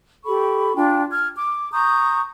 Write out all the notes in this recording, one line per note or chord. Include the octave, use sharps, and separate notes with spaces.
G4 A4 B5 C#6
D4 F4 G5
F6 G#6
D6
A#5 C#6 D#6 G6